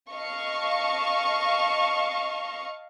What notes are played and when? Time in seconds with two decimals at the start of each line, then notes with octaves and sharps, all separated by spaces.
0.12 D#5 F5 A5 C#6